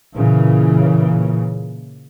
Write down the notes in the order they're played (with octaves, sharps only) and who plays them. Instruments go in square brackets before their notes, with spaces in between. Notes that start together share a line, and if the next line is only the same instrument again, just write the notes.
[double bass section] A#2 C#3 E3